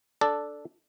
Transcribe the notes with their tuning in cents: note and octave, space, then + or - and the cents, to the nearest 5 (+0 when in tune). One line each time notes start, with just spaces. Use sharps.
D4 +0 A4 +0 D5 +0